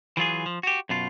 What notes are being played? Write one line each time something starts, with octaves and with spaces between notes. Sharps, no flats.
E3 F#3 F4 G#4
F3
F#4 G4
F#2 B2 F4